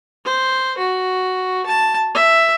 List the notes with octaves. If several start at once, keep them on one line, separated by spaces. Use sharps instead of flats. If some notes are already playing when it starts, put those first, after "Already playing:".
C5
F#4
A5
E5